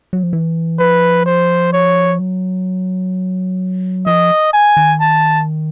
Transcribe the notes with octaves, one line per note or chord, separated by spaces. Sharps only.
F#3
F3
E3
F3 B4
C5
C#5
F#3
F3 D#5
G#5
D#3
A5